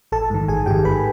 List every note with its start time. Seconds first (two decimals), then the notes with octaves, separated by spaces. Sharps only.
0.12 A1 A4 A5
0.30 G#2 D#3
0.48 A1 G#4 G#5
0.66 G#2 D#3 G4 G5
0.85 A1 B4 B5